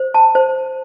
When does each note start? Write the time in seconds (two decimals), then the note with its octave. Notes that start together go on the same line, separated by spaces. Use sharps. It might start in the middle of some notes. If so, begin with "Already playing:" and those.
Already playing: C5
0.14 A5
0.35 C5